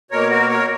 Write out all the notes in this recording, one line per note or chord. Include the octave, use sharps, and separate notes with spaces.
B2 A#3 A#4 C#5
F#4 A#4
A#4 C#5